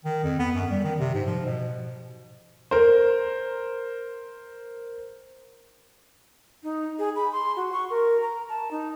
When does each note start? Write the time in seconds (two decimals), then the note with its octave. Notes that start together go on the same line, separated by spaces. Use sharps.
0.05 D#3
0.24 F2
0.39 B3
0.54 F#2
0.71 G3
0.84 D#3
0.99 C3
1.15 G#2
1.27 F3
1.45 B2
2.71 A#4 C5
6.63 D#4
6.99 G#4
7.16 B5
7.32 C6
7.56 F#4
7.73 C#6
7.90 A#4
8.21 A#5
8.49 A5
8.71 D#4